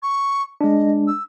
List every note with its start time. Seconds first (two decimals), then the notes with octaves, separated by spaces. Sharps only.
0.02 C#6
0.61 G#3 D4 D#5
1.07 E6